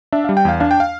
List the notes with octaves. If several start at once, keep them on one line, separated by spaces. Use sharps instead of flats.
D4 E5
G3 F5
G5
E2 F5
D4 F5
G5
F5